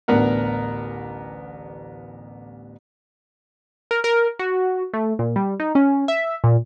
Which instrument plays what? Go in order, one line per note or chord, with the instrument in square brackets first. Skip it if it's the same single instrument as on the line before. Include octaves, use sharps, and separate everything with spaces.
[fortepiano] A1 D2 B3 D4 A#4 F#5
[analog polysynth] A#4
A#4
F#4
A3
A#2
G3
D#4
C#4
E5
A#2